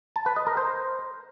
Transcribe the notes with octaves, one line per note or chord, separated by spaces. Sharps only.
A5
B4
D#5
A#4
C5